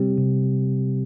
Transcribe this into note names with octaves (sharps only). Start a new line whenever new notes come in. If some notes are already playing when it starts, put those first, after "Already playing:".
Already playing: C3 G3 C4 G4
C3